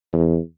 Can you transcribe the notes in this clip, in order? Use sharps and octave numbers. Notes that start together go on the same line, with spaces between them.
E2